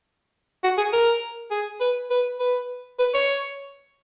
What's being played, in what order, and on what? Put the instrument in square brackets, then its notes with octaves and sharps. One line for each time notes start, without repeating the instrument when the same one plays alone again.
[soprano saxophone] F#4
G#4
A#4
G#4
B4
B4
B4
B4
C#5